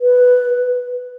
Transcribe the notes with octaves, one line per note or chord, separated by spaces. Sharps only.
B4